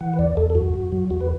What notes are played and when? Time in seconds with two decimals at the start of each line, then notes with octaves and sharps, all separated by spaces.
0.01 E3 F#5
0.14 B4
0.19 E2 D5
0.37 E2 A4
0.50 A4
0.55 F#2 F#4
0.74 F#2
0.92 F#3
1.10 E2 F#4
1.21 B4